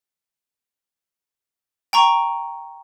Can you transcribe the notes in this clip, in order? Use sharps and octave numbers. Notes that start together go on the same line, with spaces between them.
G5 A#5 C#6